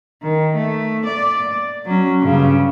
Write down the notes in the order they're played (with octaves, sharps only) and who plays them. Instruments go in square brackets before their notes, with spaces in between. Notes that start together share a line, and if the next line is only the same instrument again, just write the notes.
[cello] D#3
A3
D5
F#3 C#4
G2 C#3